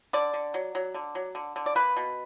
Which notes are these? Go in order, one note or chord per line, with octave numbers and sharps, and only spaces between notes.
D3 D5
D3
F#3
F#3
D3
F#3
D3
D3
D5
A#3 B4
B2